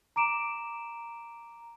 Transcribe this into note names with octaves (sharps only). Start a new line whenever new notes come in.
A#5 D6 D7 E7